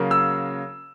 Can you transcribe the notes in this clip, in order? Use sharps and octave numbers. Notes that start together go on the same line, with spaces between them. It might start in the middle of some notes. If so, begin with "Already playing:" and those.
Already playing: C#3 F#3 A#3
E6